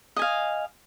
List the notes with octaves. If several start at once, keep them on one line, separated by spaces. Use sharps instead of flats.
D#5 F5 G#5